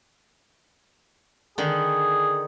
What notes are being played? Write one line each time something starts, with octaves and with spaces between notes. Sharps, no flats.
D3 D#3 G#4